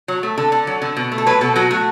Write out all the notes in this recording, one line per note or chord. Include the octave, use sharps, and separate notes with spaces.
F#3
A3
D3 A4
D3
F#3
D3
B2
A3
A4
F#3 B4
B2 A4
F#3 F#4
A3 F#4